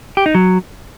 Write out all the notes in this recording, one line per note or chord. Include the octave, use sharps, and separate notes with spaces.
G4
D#4
F#3